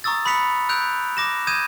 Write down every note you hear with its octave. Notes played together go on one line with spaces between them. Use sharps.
A#5 C#6 D#6 E6 A6
B5 D#6 F#6 B6 C#7 F7
E6 F#6 G6 D7 F7
D6 A#6 E7
D#6 G6 G#6 D#7 E7